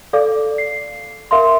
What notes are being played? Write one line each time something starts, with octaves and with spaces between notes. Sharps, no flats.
A4 D5 F5 D6
C7
A#4 E5 F5 C6